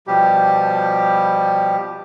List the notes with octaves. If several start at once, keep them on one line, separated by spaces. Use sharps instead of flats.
B2 F3 G3 G4